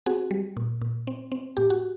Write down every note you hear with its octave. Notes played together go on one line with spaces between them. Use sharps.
C4 F#4 G#4
G3
A#2
A#2
C4
C4
A2 G4
F#4